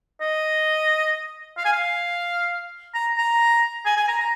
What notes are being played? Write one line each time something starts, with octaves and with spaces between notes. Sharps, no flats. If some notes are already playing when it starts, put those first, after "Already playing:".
D#5
F5
G#5
F5
A#5
A#5
G#5
G#5
A#5
A#5